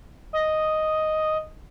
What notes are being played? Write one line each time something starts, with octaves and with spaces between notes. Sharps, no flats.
D#5